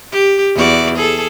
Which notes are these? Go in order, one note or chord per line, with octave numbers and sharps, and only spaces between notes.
G4
E2 F#4 D5
G#4 A4